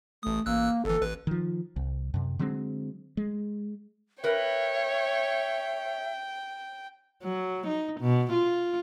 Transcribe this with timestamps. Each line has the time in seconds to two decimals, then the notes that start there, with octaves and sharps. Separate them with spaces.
0.23 A1 A3 D#6
0.46 A1 A#3 E6 F#6
0.85 G1 E3 A4
1.01 A1 B4
1.27 D#3 F3
1.76 C2
2.14 F#2 C3
2.39 D3 F#3 G#3 C4
3.17 G#3
4.24 A#4 B4 C#5 E5 G5
7.23 F#3
7.67 D#4
8.01 B2
8.33 F4